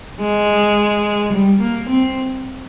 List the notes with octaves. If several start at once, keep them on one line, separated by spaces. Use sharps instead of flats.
G#3
G3
A#3
C4